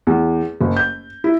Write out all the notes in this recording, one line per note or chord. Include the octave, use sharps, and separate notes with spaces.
E2
F#1
G6
E4